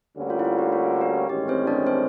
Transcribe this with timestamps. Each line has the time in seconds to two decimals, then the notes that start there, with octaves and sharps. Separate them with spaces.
0.16 D2 D3 G3 A#3 C#4
0.30 F4
0.39 E4
0.44 F4
0.58 F#4
0.73 F4
1.01 F#4
1.29 A1 G2 D#3 G#3 C#4 G4
1.48 C4 C5
1.67 D4 D5
1.86 C4 C5